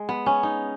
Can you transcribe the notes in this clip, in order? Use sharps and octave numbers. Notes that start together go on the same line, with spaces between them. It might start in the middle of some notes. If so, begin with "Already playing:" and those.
Already playing: G#3
B3
C#4
D#4